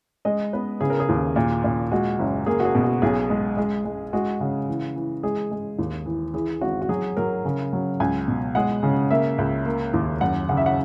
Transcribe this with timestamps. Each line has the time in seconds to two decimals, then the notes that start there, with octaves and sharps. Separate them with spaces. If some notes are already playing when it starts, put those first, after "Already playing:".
0.25 G#3 D#5
0.53 B3 B4
0.81 C#3 G#4
0.90 A#4
1.00 G#4
1.09 D#2
1.36 A#2
1.64 A#2
1.92 G#3 F#4
2.19 F#1
2.46 A#3 G#4
2.60 F#4
2.65 G#4
2.75 B2
2.84 F#4
3.02 B1 G#4
3.30 G#3
3.57 G#3
3.85 G#3
4.13 G#3 F#4
4.40 C#3
4.68 E3
4.96 E3
5.23 G#3 G#4
5.51 G#3
5.79 D#2
6.06 E3
6.34 E3 G#4
6.61 G#1 F#4
6.82 F#4
6.89 F#3 G#4
7.17 F#3 A#4
7.45 C#3
7.73 F#3
8.00 C#2 G#5
8.28 B2
8.55 G#3 F#5
8.83 C#3
9.11 A#3 E5
9.38 C#2
9.66 A#3
9.94 D#2
10.21 F#2 F#5
10.49 C#3 F#5
10.57 E5
10.66 F#5